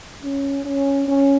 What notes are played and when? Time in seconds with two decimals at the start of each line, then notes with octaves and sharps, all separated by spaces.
0.23 C#4
0.65 C#4
1.08 C#4